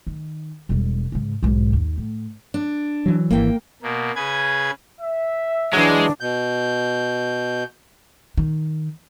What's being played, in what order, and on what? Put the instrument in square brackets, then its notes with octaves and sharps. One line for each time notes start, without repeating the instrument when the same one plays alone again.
[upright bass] D#3
E1 G3
G#2 C#3
B1 G#2
D#2
A2
[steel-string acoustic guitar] D4
[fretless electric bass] E3 F#3
[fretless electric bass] G#1 E3 [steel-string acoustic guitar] A#3 G5
[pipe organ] B2 A#3
C#3 G#4 B4 G#6
[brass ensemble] E5
[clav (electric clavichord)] E3 F#3 [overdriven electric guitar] G#3 [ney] D4
[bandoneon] B2 G6
[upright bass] D#3